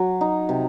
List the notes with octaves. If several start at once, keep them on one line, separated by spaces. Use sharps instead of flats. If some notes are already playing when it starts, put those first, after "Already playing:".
Already playing: F#3
D#4
C3